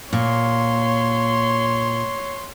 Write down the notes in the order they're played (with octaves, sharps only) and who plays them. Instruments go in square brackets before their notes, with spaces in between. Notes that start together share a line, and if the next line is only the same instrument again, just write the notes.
[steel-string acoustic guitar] A#2 [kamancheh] C#5 C6